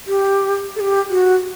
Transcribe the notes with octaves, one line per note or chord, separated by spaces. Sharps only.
G4
A4
G4
F#4